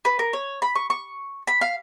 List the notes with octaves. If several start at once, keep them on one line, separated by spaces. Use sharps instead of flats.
B4
A#4
C#5
B5
C#6
C#6
B5
F5